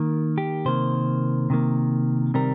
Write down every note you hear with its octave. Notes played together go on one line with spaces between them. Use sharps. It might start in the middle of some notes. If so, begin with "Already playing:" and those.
Already playing: D#3 A#3
G4
C3 D#3 A#3 C5
C3 D#3 A#3
C3 D#3 G3 C4 A#4